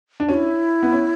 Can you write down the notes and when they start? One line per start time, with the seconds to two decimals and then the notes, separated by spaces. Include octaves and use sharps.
0.20 D4
0.29 C#4 F#4
0.34 E4
0.83 B3
0.93 C#4